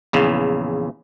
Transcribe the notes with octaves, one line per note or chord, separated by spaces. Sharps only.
A#1 E2 C#3